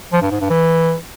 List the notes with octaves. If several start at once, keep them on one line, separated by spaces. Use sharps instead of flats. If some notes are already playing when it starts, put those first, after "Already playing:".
F3
G2
G#2
G2
E3